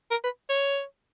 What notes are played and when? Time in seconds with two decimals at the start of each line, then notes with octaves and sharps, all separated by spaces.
0.11 A#4
0.24 B4
0.49 C#5